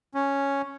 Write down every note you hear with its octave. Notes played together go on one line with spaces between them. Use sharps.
C#4